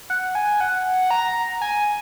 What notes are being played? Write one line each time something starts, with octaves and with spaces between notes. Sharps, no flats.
F#5
G#5
F#5
A#5
G#5